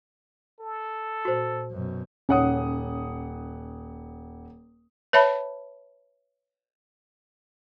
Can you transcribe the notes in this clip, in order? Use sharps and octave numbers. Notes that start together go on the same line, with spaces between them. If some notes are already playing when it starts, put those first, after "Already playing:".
A4
A#2 F#4 C5
F#2 B2
D#1 C#4 F#5 D#6
B4 C#5 E5 A5 B5